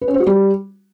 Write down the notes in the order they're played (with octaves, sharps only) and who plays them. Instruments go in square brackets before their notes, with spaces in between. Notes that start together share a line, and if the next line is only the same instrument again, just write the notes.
[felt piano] B4
C#4
C5
F#4
G3